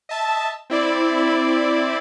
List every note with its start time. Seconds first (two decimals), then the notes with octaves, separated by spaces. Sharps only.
0.09 D#5 E5 A5
0.70 C4 E4 D5 B5